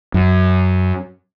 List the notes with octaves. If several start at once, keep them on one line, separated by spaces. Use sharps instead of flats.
F#2